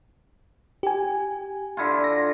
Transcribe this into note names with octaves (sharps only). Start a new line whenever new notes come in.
G4 G#5
D3 E4 F4
A#6